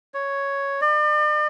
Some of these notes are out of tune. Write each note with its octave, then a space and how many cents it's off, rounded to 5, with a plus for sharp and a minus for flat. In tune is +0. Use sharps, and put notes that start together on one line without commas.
C#5 +0
D5 +40